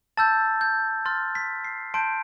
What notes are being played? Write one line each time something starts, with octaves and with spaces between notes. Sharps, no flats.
A5 E6 G6 A6
G6
C6 F6 A6
B6
C7
A5 C6 G6 D7